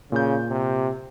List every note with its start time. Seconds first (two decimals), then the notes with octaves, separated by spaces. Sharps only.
0.12 A#2 C#3 G6
0.49 C3